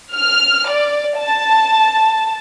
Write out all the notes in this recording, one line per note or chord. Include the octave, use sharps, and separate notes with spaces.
F6
D5
A5